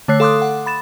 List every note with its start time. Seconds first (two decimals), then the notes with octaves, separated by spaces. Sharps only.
0.08 D3 A3 C#5 F#6 C7
0.20 A4 F5 C6 D6 D#6 F#6
0.42 F#5
0.66 B5 A6 E7